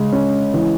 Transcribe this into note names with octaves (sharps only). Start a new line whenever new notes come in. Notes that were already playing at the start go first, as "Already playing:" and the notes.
Already playing: C#3 G#3
C#4
E3